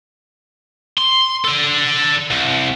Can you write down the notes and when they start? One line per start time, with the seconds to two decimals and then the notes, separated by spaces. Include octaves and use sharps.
0.98 C6
1.45 A4 D5
2.31 C2